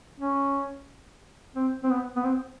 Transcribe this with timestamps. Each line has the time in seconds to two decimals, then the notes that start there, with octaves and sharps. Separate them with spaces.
0.20 C#4
1.56 C4
1.84 C4
1.90 B3
2.16 B3
2.24 C4